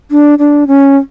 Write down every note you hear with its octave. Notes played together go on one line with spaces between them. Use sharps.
D4
D4
C#4